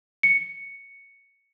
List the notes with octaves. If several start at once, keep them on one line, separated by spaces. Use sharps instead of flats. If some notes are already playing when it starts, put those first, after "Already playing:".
C#7